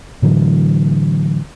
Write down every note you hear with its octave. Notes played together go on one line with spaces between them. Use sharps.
A2 D3 E3 F#3